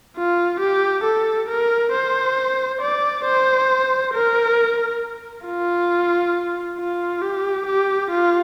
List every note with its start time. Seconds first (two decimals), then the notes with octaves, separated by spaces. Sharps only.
0.16 F4
0.60 G4
1.04 A4
1.49 A#4
1.92 C5
2.81 D5
3.25 C5
4.13 A#4
5.45 F4
6.79 F4
7.22 G4
7.67 G4
8.10 F4